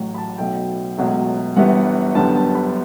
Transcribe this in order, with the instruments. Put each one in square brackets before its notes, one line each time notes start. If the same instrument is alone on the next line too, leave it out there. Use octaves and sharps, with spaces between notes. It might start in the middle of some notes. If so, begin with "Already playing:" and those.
Already playing: [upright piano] A1 A2 F#3
B5
A5
B1 B2 A3 G5
C#2 B2 F#3 A3
G1 G2 E3 G3 B3 F#5
G1 F#2 D3 G3 B3 A5
A5
A5
B5